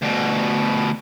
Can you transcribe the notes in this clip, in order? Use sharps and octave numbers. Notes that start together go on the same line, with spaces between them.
D2 B2